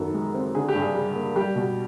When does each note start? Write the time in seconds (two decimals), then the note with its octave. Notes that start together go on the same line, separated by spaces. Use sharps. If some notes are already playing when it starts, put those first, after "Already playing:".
Already playing: F#2 D#3 B3 A4
0.14 G#3
0.34 C4
0.55 D3 G#4
0.69 G4
0.75 G2
0.81 G#4
0.95 G3
1.15 A#3
1.36 G3 G4
1.56 B2